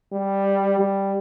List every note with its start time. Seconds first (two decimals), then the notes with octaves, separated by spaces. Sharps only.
0.12 G3
0.79 G3